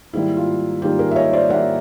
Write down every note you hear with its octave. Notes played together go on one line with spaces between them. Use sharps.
G#2 D#3 G3 A#3 E4
F4
G#2 D#3 G3 A#3 F4 G4
G#4 A#4
E5
C#5 D#5
C5 D5
G#2 D#3 G3 A#3 E5 F#5